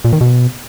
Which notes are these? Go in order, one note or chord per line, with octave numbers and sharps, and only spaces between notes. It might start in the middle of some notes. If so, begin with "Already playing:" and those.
A#2
D#3
B2